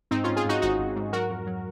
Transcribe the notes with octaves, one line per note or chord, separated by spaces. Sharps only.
G#2 C4 D#4
G#2 C#4 F4
F4 G#4
G#2 D#4 F#4
G#1 D#4 F#4
G#1
G#2
F#3 F#4 A#4
F2
F#3